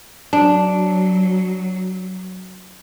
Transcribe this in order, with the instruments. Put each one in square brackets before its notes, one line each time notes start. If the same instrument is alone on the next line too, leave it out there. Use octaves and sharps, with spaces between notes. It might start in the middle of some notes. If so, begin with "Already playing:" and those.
[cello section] F#3 [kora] D4